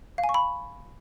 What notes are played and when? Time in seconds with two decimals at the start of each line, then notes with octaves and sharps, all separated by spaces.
0.18 F5
0.24 G#5
0.29 C#6
0.34 B5